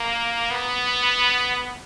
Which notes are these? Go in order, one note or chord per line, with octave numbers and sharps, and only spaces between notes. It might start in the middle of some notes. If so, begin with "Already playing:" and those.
Already playing: A#3
B3